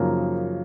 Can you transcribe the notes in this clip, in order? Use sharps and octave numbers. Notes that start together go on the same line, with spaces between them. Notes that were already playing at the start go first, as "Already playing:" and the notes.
Already playing: F#2 C#3 F3 A#3 D#4